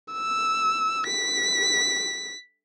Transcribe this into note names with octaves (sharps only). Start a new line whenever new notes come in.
E6
B6